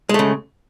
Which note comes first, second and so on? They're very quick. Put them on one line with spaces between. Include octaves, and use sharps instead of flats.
G#3 A3 C#3